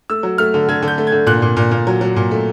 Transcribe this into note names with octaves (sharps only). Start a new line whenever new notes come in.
A3 E6
F#3
A3 F6
D3
D3 G#6
D3
G6
A3
G#6
D3
A#2 F#6
A#2
A#2
A#2
F#3
F#3
A#2
A3